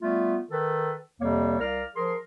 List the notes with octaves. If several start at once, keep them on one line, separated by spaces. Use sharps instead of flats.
G3 A3 B3 F4
D#3 A4 B4
F2 C3 G3 A#3 C#5
C2 A#4 D5 F5 F6
F3 G#4 A#4 C6